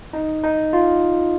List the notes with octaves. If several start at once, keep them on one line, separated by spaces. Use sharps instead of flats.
D#4
D#4
F4